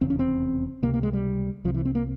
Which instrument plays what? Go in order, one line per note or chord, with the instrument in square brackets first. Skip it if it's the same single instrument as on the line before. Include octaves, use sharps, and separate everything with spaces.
[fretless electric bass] F1 E2 C#3 C4
C#4
C4
C#2 C3 A#3
A#3
G#3
G3
C2 C3 F3
E3
C4
A#3